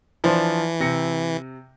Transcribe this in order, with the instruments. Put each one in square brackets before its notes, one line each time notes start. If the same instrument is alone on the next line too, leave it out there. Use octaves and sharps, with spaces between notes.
[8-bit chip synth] E3 [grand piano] F3 D4 C5
[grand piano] C3 A#6 C#7